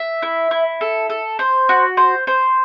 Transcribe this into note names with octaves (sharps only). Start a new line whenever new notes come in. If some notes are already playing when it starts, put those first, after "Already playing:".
Already playing: E5
E4
E4
A4
A4
C5
F#4
C5
C5